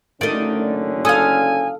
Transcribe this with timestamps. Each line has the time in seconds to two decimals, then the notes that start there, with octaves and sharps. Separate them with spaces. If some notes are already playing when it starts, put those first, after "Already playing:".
0.21 F#1 D3 D#3 A3 C#4 D5 D#5
1.05 A4 F5 G#5 D#6